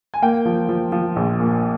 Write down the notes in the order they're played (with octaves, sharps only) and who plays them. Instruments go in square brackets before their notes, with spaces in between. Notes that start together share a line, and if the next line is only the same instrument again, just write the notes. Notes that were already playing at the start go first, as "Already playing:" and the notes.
[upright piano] G#5
A#3 G5
F3
F3
F3
A#1
A#2